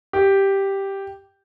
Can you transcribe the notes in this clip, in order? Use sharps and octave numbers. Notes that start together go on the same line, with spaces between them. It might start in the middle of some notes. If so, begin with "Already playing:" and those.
G4